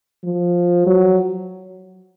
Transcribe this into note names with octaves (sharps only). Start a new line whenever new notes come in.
F3
F#3